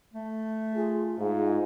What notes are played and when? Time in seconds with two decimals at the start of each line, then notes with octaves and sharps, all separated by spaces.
0.14 A3
0.75 F4 G#4
1.19 G#2 F4 G#4